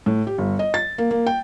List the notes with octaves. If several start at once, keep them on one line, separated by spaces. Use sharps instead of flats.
A2
G4
G1
D#5
A6
A#3
A#3
G5